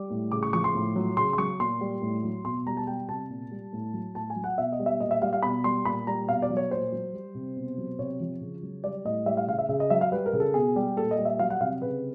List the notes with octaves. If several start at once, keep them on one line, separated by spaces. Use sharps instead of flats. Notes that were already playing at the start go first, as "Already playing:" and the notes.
Already playing: G3 D6
A2
C#3 D6
C#6
F3 C#6
C6
A2
F#3
C#3 C6
C6
F#3 C#6
A#2 C6
G3
A2
F#3
B2 C6
G3 A#5
A5
G3 G5
C3 A5
A#2
G3
A2
F#3
A2 A5
G#5
F#3
F#5
B2 E5
D#5
G3
E5
A#2 D#5
E5
G3 F5
F5
B2 B5
G3 C6
A#2 B5
G3 A#5
B2 F5
D5
F#3
C#5
A#2 C5
F#3
G3
C3
B2
F#3
C3 C#5
F3
C#3
F#3
G3 D5
A2 D#5
G3 E5
F5
C#3 F5
E5
C#3 E5
D#5
F#3 E5
F5
G3 B4
A#4
C#3
A4
B2 G#4
G3 G4
A#2 A4
D#5
G3
E5
F#3 F5
F#5
C3 F5
C#3 B4